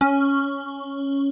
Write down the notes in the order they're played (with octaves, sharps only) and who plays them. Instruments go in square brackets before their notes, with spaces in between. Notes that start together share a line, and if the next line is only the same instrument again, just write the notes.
[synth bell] C#4